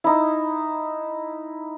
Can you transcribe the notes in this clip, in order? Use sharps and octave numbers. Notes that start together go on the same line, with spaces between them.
D#4 E4